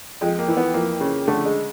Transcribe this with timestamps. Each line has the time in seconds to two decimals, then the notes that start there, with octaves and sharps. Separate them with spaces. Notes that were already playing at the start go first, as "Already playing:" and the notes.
0.21 F2 G#3
0.39 A#3
0.48 E3
0.57 B3
0.74 F2 A#3
1.01 C#3
1.28 D3 A3
1.45 G#3